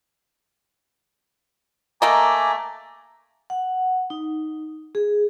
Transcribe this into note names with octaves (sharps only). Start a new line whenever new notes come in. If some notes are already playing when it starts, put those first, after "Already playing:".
A3 A#3 D#5 G#5 A#5 D6
F#5
D#4
G#4